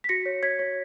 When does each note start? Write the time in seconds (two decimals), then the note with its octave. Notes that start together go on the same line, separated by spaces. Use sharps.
0.04 B6
0.09 F#4 A#6 C#7
0.26 C#5
0.43 C#5 G#6 B6
0.59 C#5